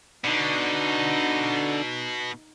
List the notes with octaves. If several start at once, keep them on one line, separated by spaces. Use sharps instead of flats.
B2 D3 D#4